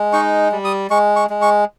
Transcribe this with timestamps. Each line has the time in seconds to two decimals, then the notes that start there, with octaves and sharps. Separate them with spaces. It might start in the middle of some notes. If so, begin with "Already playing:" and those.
Already playing: G#3
0.13 D#4 C#6
0.52 G3
0.65 D#6
0.90 G#3 C#6
1.16 C#6
1.30 G#3
1.42 C#6